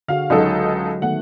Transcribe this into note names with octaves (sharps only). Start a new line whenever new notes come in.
D3 F#4 G#4 F5
C#2 F#3 G#3 D#4 F#4 A4
D#3 A3 B3 F#5